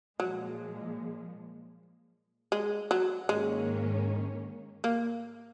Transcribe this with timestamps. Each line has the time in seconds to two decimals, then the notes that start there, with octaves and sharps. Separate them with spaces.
0.20 A#2 F3 F#3 G#3
2.52 G#3
2.91 F#3
3.29 G#2 D#3 G#3 A#3 C#4
4.84 A#3